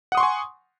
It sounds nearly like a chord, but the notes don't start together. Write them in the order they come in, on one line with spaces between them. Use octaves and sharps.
F#5 D#6 C6 C#6 G#5